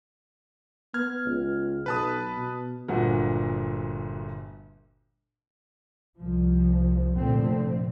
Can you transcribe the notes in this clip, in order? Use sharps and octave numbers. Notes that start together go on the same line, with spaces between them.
B3 F6 G#6
C#2
B1 B4 A5 D#6
B2
G1 D2 A#2 F#3 F#5
C2 F3
F1 A#2 D3 A3 C4